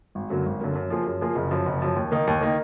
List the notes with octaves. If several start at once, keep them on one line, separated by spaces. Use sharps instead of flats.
G#1
F#2 D3 F#3 A#3
G#1
F#2 D3 F#3 A#3
F#2
F3 A#3 F4 G#4
F#2
F3 A#3 F4 G#4
F#1
F#2 F3
F#1
F#2 F3
D#2
D#3 A#3 D#4
D#2
D#3 A#3 D#4